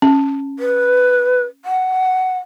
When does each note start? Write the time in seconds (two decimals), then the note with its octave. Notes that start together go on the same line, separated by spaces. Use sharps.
0.02 C#4
0.59 B4
1.65 F#5